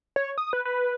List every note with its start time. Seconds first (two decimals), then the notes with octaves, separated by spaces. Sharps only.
0.16 C#5
0.38 D#6
0.53 B4
0.65 B4